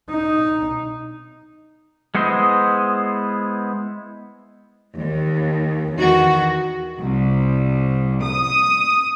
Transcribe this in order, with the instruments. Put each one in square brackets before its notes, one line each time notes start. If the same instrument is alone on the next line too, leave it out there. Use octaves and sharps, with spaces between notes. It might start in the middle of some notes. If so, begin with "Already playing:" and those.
[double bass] D#4
[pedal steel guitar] G#3 B3 E4 C5 D#5
[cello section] D#2
E2 D#3 F#4
[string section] C2
D#6